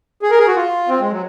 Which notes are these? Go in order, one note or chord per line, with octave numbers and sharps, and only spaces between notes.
G#4
A#4
G#4
F#4
F4
C4
G#3
F#3